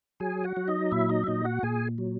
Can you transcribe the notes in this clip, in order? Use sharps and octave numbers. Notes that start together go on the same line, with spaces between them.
F#3 G#4 G#5
F#4 F#5
F#3
D#4 D#5
A#2 E4 E5
D#4 D#5
E5
A#2 D#4 D#5
F#4 F#5
A#2 G#4 G#5
F#3